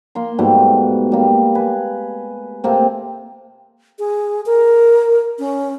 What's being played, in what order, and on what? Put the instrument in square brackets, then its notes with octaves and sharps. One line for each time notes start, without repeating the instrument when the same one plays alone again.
[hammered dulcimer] A#3 C6
G#2 B2 G3 A3
G3 A#3
B4 G#5
C3 A3 A#3 C4
[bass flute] G#4
A#4
C#4